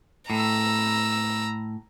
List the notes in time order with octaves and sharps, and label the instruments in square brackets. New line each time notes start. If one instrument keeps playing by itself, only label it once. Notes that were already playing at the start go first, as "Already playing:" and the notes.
[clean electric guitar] A2 [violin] A#5 E6